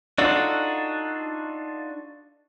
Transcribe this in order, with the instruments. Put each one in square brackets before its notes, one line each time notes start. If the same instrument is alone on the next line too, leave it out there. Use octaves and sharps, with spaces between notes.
[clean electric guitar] D4 D#4 F4 F#4 A4